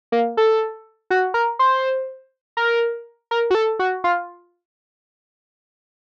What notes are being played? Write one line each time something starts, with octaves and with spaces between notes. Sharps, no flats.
A#3
A4
F#4
A#4
C5
A#4
A#4
F#4
A4
F#4
F4